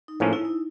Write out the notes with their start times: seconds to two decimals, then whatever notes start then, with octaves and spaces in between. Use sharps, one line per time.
0.08 D#4
0.20 A2 F3 A#3 C#4
0.33 E4
0.45 D#4